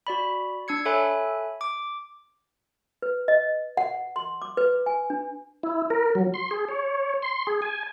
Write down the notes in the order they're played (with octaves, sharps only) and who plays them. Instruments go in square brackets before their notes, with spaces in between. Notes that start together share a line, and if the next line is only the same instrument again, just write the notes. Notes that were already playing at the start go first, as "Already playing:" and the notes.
[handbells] F#4 D5 B5
D4 E6 G#6 C#7
A4 C#5 E5 G#5 B5 F#6
D6
[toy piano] B4
D#5
F#5
C6
D6
B4
G#5
D4
[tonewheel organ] E4
A#4
F#3
C6
G#4
C#5
C6
G#4
G#5